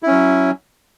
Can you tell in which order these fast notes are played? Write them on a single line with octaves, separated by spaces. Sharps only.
E4 C#4 F#3